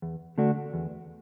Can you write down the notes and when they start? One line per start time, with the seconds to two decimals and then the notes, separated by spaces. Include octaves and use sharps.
0.02 E2
0.38 D3 A3 D4 F#4
0.74 E2